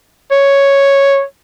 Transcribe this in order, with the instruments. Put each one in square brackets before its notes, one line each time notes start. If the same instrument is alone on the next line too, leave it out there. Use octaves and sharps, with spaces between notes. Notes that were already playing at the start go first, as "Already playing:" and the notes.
[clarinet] C#5